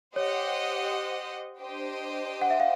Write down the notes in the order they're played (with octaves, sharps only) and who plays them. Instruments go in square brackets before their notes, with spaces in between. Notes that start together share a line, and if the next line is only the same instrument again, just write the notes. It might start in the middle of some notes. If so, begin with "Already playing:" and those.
[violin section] G4 C5 D#5 F#5 [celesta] C#5
[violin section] D4 G4 C5 D#5 G5
[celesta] F#5
E5
F5